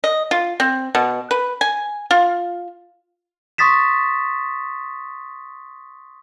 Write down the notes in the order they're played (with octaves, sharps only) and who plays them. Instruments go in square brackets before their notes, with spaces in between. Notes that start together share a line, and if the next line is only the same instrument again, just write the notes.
[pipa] D#5
F4
C4
B2
B4
G#5
F4
[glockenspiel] C6 C#6 D#6 A6 B6 E7